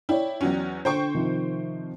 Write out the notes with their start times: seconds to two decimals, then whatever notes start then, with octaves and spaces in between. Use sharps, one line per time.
0.09 E4 C#5 D5 G5
0.41 E2 F#3 C#4
0.85 D3 C5 G5 C#6
1.15 C3 D#3 F3